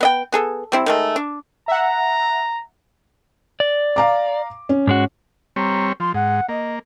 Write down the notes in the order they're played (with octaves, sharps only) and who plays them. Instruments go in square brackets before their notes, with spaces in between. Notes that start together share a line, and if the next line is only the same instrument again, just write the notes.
[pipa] B3 D#5 G5
B3 G#4 A4
G3 C4 E4
D#3 G#3 A3
D4
[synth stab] E5 F#5 [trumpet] A#5
[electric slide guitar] D5
[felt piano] F5 A#5 D6
C#4
[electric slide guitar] G#2 G#3 F#4
[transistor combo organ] G3 C4 C#5 [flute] A#5
[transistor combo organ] F3 [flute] C6
[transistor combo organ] G#2 [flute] F#5
[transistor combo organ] A#3 [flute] D#5